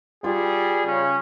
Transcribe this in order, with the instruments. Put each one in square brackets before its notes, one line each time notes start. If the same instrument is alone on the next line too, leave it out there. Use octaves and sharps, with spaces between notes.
[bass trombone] G3 [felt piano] F4 [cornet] G#4
[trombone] C#3 [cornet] C#4